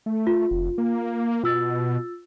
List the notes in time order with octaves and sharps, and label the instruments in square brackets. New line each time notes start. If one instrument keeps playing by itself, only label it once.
[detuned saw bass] A3
[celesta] F4
[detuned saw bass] F1
A#3
[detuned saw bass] B2 [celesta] F4 E6 A6